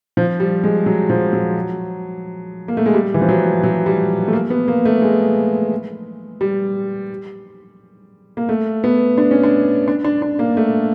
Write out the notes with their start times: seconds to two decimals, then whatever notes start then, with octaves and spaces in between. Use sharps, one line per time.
0.17 F3
0.40 G3
0.64 G#3
0.86 F#3
1.10 F3
1.33 F#3
2.68 A#3
2.77 A3
2.86 G#3
2.94 G3
3.14 E3
3.21 F3
3.29 F#3
3.64 F#3
3.86 G3
4.28 A3
4.33 A#3
4.50 B3
4.68 A#3
4.85 A3
5.02 G#3
6.41 G3
8.37 A#3
8.49 A3
8.84 B3
9.18 D4
9.31 C#4
9.43 D4
9.88 D4
10.04 D4
10.22 D4
10.39 A#3
10.57 A3